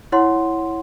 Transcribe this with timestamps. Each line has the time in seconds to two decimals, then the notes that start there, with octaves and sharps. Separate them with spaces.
0.12 E4 C#5 F#5 C6